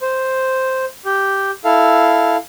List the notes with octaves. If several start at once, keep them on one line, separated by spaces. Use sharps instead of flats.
C5
G4
E4 A4 F5